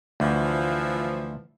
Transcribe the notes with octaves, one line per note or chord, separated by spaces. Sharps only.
D2 E3 F3